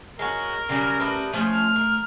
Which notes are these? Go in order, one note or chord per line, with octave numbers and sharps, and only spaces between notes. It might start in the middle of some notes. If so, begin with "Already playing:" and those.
G#3 C#4 F#4 A#4
C#3 F#3 G3 C#4 F6
G3 A3 B4 D#6
F3 A3 C#4 C5
F6
A#4